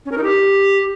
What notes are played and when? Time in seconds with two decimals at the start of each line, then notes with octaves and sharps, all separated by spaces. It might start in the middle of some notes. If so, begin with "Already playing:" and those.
0.05 C#4
0.11 A#4
0.17 D#4
0.23 G4